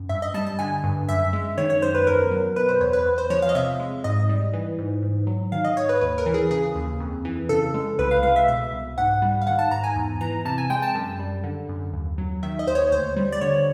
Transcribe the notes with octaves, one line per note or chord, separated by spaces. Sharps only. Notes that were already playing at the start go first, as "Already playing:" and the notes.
Already playing: F#2
G2 E5
D#5
G3 A5
A5
D3 G#5
G2
F#2 E5
G#3
D#3 C#5
C#5
F#2 C5
B4
E2 A#4
F#3
B2 B4
C5
E2 C#5
B4
E2
C5
F3 C#5
F5
D#5
C3 E5
G#3
G#2 D#5
G3
E3
G#2
G#2
F#3
D#3 F5
D#5
G#2 C#5
B4
D#2 B4
A#4
E3
G#4
C#3 G#4
D#2
F2
E3
C#3 A4
G#3
C2 B4
F5
G#3 F5
E5
B2 E5
C2
G#2 F#5
G3
F5
D#3 F#5
A5
G#2 A#5
G#5
E2
E3 A#5
C3 A5
G#5
G#3 G5
A5
F#2
G3
D3
F#2
D#2
F#3
D#3 E5
D#5
D#2 C5
C#5
D2 C5
G3
D5
D3 C#5